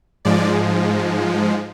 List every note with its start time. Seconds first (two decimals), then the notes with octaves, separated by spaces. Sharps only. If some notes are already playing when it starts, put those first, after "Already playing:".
0.25 G#2 F3 G#3 D5